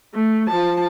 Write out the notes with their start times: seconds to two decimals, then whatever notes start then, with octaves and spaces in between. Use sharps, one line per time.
0.14 A3
0.47 F3 A5